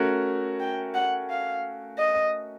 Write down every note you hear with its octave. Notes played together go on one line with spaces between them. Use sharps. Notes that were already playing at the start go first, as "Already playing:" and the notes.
Already playing: A3 C#4 F#4 A#4
G5
F#5
F5
D#5